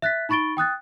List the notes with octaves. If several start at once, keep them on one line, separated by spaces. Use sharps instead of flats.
E5 F#6 A6 B6
D#4 B5 C#6 A6 D7 G7
G5 D#6 F#6 A6